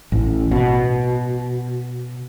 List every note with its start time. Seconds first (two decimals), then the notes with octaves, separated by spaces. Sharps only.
0.12 A1
0.51 B2